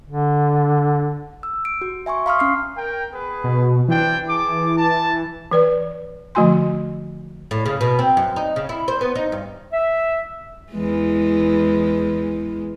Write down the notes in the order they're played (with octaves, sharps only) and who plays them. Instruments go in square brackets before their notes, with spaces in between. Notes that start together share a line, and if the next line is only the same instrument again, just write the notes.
[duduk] D3
[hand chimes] E6
D7
F#4
E5 G#5 C6 C#6
F5 A#5 C6 C#6 D#6 F6
C#4 F6 C7
[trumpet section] A#4 G5
B3 G#4 B4
[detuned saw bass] B2
[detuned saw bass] E3 [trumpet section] C4 D4 G5
[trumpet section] G#4 A5 D6
A5
[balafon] E3 B4 D5
D3 F3 A3 F#4 G#5 C6
[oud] A2
C#3
B2
C4
F#2
D#4
C#3
E4
C5
B3
D#4
G2
[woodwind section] E5
[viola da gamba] E2 E3 G#3